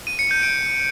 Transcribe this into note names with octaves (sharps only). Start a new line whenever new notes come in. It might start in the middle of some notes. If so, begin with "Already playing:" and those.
D#7
C#7
G6
D7